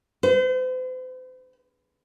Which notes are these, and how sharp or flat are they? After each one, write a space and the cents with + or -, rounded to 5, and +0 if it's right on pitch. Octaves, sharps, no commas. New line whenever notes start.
C5 -40